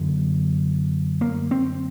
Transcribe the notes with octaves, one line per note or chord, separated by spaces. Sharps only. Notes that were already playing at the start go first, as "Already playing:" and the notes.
Already playing: F#2 D3
A#3
C4